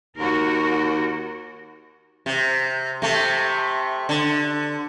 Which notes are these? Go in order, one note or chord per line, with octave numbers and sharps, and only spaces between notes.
D#2 F#4 A#4
C3
C3 A3
D3